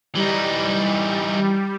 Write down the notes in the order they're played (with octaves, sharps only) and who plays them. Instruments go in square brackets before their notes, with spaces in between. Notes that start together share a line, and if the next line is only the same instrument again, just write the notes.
[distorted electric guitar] E3 D#4 [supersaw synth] G3